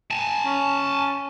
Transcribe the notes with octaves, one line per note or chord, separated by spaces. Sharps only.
G#5 A5
C#4